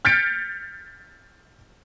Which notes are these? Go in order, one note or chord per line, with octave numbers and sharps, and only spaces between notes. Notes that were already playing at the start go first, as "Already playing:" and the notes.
F6 G6 A6 B6 C#7 D7